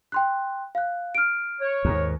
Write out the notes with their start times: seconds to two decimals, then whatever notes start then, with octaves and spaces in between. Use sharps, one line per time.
0.12 G5 C6 F#6
0.75 F5 F#6
1.15 F6 D7
1.61 C#5
1.85 D#2 G#2